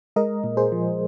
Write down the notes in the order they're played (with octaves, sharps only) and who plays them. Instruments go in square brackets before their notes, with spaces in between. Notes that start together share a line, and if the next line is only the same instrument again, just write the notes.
[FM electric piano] G#3 A#4 D#5
A#2
G#4 C5
F3